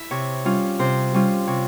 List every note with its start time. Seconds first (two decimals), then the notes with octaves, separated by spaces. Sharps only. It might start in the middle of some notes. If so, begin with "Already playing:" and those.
Already playing: E4 E5
0.11 C3 C#5
0.45 G3 C#4 F4
0.79 C3 C5
1.14 G3 C#4 F4
1.47 C3 C#5